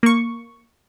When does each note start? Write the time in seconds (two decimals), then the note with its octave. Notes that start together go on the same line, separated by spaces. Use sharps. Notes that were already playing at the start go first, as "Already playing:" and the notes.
0.03 A#3 C#6